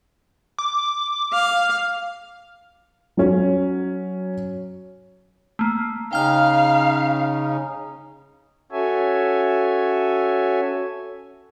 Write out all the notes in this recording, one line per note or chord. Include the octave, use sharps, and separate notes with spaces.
D6
F5
F#3 C#4
A3 A#3
C#3 C#4 D#4 F5 G5 F6
C#4 F#4 A4 C#5 E5 G#5